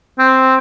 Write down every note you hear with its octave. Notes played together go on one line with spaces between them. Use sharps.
C4